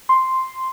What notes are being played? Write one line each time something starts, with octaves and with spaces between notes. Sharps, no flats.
C6